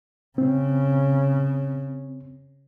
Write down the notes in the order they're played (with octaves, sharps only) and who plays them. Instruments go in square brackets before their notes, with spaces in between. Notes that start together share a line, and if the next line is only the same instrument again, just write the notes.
[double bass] C#3 [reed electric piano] C4